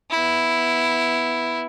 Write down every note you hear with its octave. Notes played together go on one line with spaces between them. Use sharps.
B3 E4